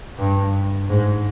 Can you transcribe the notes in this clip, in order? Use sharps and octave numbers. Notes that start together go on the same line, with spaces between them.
G2
G#2